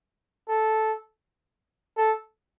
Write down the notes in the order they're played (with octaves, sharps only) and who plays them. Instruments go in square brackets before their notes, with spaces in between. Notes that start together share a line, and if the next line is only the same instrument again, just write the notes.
[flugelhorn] A4
A4